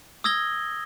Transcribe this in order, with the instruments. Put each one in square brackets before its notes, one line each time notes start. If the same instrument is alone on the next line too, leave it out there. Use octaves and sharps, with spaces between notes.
[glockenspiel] D#6 E6 G#6 A#6 G7